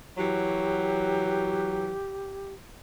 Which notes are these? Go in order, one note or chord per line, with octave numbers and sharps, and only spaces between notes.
E3 F#3 G4